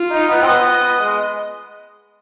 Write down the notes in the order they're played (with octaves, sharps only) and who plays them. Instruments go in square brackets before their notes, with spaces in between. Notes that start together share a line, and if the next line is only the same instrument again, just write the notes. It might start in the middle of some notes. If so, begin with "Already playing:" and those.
Already playing: [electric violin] F4
[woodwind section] D#4
B3
C4
[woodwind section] B3 [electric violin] D#5
[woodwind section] G#3